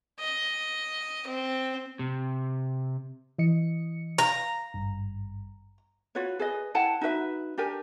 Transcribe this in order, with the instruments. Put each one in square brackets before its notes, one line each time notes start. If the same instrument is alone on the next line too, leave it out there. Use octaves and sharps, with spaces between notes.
[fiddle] D#5
C4
[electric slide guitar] C3
[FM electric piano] E3 D#5 C#7
[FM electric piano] F5 [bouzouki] A#5
[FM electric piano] G#1 G2
[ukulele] F4 F#4 B4 C#5
G#4 B4 D#5
E4 F#5 G5 A5
D#4 F#4 B4 E5
D4 G4 A#4 G#5